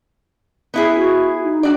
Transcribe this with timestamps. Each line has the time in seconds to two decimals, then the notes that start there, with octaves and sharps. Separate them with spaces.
0.74 B3 E4 G#4
0.96 F#4
1.44 D#4
1.63 D4 F#4 D5